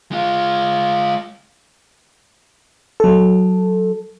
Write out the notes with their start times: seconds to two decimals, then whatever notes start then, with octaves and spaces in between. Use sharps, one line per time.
0.11 G#3 F4
3.00 F#3 A4